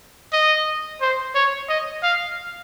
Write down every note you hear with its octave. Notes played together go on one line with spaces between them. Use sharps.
D#5
C5
C#5
D#5
F5